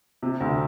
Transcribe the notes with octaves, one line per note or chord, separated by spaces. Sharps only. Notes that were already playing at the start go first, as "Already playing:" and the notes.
C3
D2